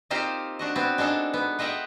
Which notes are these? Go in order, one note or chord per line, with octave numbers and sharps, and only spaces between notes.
A#3 C4 D#4 F4 G4 C5
D4 F#4 D#5
B3 C4
G#3 D4 D#4 A4
B3
F4 D#5 E5 F#5 G5